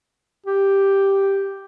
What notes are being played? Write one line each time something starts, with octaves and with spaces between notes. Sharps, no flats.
G4